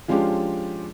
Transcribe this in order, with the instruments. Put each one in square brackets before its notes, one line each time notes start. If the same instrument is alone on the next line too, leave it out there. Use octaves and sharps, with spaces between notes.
[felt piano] F3 G#3 C#4 D4 F4 G4